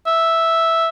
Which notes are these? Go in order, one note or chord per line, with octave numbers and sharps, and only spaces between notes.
E5